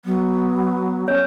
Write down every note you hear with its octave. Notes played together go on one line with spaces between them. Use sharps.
F#3 B3
C#4 C#5